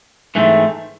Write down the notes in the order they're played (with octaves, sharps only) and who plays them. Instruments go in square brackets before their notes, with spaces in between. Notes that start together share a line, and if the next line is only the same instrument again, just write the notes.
[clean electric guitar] G#2 E3 A3 C4